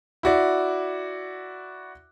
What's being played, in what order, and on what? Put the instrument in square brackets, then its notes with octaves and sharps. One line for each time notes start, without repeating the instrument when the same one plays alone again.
[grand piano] E4 F#4 D5